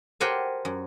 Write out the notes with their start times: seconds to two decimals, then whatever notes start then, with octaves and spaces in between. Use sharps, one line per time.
0.20 G4 A#4 C5 F#5 G#5 A5
0.65 F#2